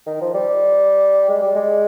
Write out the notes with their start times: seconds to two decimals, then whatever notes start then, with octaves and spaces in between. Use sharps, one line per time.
0.06 D#3
0.21 F3
0.34 G3
1.29 G#3
1.42 G3
1.55 G#3